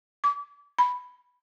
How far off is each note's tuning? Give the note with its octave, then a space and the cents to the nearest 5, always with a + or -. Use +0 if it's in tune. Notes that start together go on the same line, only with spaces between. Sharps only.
D6 -35
B5 +5